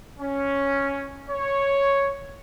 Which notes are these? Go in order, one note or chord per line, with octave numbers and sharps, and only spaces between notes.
C#4
C#5